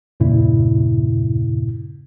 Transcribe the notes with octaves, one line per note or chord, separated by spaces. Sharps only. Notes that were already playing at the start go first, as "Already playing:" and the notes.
E2 G2 A#2 C#3 E4